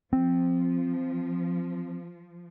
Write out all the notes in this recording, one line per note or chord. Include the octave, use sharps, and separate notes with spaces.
F3 C4